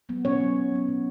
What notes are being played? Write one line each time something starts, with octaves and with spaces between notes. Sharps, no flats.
F#3 B3
B2 C#4 C#5
F#3 B3
B2
F#3 B3
B2